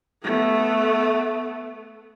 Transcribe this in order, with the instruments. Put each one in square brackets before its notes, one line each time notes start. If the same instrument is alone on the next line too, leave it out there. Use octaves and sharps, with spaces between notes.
[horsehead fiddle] A3 B3